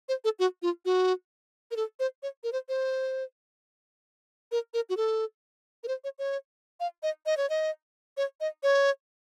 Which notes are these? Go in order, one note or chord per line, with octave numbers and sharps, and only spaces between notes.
C5
A4
F#4
F4
F#4
A#4
A4
C5
C#5
A#4
C5
C5
A#4
A#4
F#4
A4
A#4
C5
C#5
C#5
F5
D#5
D#5
C#5
D#5
C#5
D#5
C#5